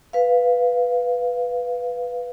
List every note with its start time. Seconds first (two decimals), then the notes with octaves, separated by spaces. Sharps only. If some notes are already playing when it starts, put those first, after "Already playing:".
0.13 B4 F5